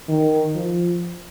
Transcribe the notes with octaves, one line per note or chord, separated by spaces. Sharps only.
D#3
F3